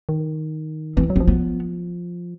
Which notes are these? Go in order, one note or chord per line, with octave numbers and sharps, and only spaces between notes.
D#3
E3 C4
F#3
F3 C4
B3